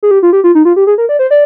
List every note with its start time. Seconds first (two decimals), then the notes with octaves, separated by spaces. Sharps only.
0.03 G#4
0.11 G4
0.23 F4
0.33 G4
0.44 F4
0.55 D#4
0.65 F4
0.76 G4
0.87 G#4
0.98 A#4
1.09 D5
1.19 C5
1.31 D5